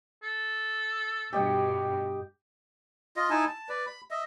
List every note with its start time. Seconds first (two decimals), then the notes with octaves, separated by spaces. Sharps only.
0.23 A4
1.33 G2 B2 G4 D#5 G5
3.16 F4 D#5
3.30 D#4 E4 G#5 A5
3.48 A5
3.69 B4 D5
3.86 B5
4.11 D#5 E5